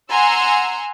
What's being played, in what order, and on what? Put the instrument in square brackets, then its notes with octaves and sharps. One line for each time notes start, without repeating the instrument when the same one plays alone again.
[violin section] F#5 G#5 A#5 C6 E6